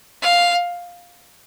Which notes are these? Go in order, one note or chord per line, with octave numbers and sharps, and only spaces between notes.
F5